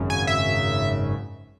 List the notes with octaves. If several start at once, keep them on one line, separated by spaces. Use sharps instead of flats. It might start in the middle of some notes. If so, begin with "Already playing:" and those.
Already playing: G#1 F#2 C#3
G#5
E5